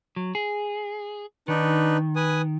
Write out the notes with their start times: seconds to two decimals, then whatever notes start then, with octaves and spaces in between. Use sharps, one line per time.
0.16 F#3
0.35 G#4
1.48 D#3 D4 D#4 B4
2.16 B4 G#5 D#6